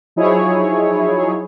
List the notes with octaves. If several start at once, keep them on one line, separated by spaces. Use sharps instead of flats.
F3 F#3 D#4 E4 G#4 C#5